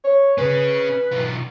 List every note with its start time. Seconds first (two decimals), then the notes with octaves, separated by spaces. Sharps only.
0.04 C#5
0.38 C#4 G#4 B4
1.12 B1 F4